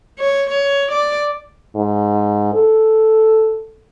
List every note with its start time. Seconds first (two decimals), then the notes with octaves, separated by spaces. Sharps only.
0.19 C#5
0.50 C#5
0.91 D5
1.75 G#2
2.54 A4